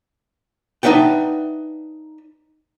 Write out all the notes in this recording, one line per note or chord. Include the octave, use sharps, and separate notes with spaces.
D4 D#4 B4 E5 F#5 G5